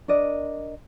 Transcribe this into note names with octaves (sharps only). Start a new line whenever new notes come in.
D4 A#4 D5 D#5